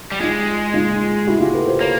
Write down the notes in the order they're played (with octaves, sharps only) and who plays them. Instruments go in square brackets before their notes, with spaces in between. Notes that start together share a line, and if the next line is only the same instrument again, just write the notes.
[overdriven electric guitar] G3
[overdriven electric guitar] G#3 [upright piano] D#4 F4
[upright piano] D#4 F4
E4 F#4
F4 G4
A4 B4
A#4 C5
[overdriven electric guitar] A#3 [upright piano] B4 C#5